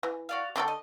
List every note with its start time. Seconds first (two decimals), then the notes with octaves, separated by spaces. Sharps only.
0.03 E3
0.29 F#4 D5 F5
0.56 D3 D#4 A4 D5 G5 C#6
0.68 D#5